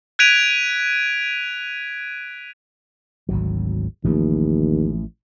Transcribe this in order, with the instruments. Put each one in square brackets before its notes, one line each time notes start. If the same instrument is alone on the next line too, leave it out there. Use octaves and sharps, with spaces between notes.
[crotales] F#6 G#6 B6 D7 D#7 F7
[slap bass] G#1 D2 F#3
[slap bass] A1 F3 A3 [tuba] D#2